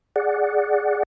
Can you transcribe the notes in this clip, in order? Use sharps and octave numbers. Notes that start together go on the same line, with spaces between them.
G#4 D5 F#5